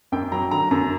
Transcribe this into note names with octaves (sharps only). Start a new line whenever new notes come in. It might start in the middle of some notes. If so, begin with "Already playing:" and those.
F#2 G5
F#3 A#5
D3 A#5
F#2 A#5